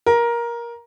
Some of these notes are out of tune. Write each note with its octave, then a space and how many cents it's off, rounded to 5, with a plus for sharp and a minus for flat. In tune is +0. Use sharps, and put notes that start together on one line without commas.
A#4 +15